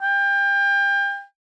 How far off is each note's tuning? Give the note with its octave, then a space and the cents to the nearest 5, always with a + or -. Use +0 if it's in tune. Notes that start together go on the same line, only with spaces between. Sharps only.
G5 +30